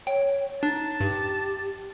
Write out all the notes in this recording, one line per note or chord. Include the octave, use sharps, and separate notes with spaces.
C#5 G5
D4 D#4 A5
G2 G4